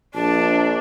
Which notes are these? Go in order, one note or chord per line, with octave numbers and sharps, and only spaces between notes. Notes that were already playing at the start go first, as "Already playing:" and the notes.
A#1 D4 A5